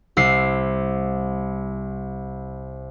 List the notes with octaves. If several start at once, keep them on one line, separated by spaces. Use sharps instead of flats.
C2 E6 C7